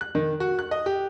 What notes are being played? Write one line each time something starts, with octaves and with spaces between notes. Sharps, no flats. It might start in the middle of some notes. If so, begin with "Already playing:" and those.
F#6
D#3
F#4
F#6
D#5
G4